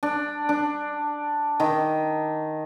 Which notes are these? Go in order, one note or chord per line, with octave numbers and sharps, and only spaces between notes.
D4
D4
D#3